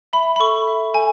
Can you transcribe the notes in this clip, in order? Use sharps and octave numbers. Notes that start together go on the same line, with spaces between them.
E5 B5
B5
A4 C#6
E5
A4 G#5